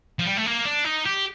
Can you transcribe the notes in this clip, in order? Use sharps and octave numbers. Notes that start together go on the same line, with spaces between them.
F3
G3
A3
A#3
D4
D#4
G4